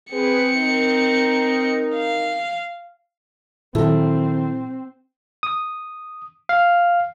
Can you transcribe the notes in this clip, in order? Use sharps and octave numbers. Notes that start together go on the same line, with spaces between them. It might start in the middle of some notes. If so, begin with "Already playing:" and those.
C4 G#4 B4 C#7
D#4 A#4
F5
A#2 D#3 F#3 C4 E4 A4
D#6
F5